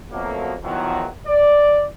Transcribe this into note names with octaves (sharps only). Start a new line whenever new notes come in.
F2 B2 F3 F#3 A3 A#3
E2 D#3 F3 F#3
D5